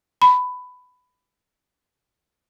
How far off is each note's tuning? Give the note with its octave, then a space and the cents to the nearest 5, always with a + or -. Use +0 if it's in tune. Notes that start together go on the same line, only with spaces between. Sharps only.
B5 +15